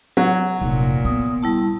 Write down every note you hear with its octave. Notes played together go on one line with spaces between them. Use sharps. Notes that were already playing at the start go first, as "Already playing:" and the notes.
F#3
F1 A#2
B3 D#6
G3 E4 A5